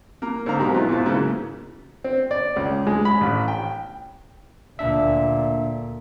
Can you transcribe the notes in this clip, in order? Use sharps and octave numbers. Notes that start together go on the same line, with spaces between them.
A#3
G#2 D3 F5 A#5
B2 F#3 C4 D#4 G4
E3 F4
G#2 B2 B3 F4
D#2 G#2 C#3 E3 F#3
C4
D5
C#2
G#3
B5
A1
G5
D2 A#2 D4 E5